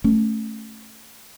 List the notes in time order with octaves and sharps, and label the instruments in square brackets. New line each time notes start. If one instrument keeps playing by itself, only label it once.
[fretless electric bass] A3 C#4